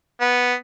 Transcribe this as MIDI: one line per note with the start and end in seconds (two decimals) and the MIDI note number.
0.21 0.54 59